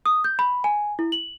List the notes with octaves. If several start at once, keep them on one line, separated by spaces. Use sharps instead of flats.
D#6
G6
B5
G#5
E4
F#7